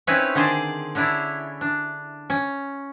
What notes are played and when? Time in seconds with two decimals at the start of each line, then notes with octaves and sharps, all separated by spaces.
0.07 C4 C#4 D#4 E4 B4 C#5
0.35 D3 D#3 G#4 C5 D5
0.95 D3 C#4 D4 E4
1.61 D4
2.30 C#4